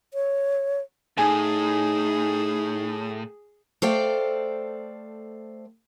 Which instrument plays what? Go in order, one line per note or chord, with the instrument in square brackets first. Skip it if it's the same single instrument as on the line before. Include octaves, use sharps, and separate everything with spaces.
[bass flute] C#5
[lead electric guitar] A2 [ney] D#4 [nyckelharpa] G#4 [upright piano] G#5
[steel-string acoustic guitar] A3 A4 C5 D5 F5 G5